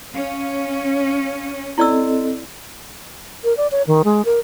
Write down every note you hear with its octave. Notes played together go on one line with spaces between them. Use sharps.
C#4 F5
C4 E4 A4 D5 D#5 E6
A#4
D5
C#5
D#3
G#3
A#4